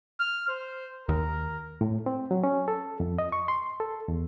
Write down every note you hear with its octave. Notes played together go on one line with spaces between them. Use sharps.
F6
C5
D#2 A#4
A2
C4
F#3
C#4
A4
F2
D#5
C#6
C6
A4
E2